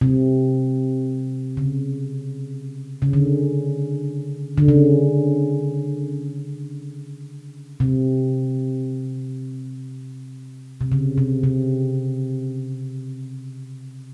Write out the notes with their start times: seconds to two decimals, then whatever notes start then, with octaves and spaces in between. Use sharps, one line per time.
0.01 C3
1.57 C#3
3.02 C#3
3.13 D3
4.58 D3
4.68 C#3
7.80 C3
10.81 C3
10.92 C#3
11.18 C3
11.43 C3